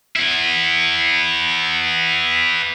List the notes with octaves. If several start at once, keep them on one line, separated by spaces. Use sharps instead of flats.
B3 E4